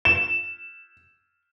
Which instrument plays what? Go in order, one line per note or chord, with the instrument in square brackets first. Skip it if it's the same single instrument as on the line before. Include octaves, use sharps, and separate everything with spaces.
[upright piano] E7